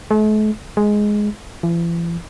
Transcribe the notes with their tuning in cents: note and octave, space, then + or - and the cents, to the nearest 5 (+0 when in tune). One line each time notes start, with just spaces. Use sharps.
A3 -45
G#3 +5
E3 +45